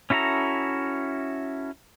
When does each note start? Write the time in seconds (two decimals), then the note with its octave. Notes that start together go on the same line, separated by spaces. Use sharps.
0.10 C#4 E4 F#4 A4 A#5